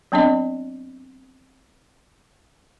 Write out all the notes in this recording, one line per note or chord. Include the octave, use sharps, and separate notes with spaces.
F#3 B3 C4 D4 D#5